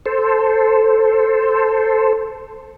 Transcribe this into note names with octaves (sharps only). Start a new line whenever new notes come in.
A4 C5